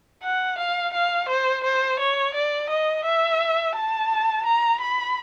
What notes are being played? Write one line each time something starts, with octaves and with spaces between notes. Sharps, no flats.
F#5
F5
F5
C5
C5
C#5
D5
D#5
E5
A5
A#5
B5